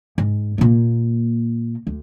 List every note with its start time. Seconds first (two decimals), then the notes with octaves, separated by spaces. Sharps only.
0.18 G#2
0.58 A#2 A#3
1.87 D2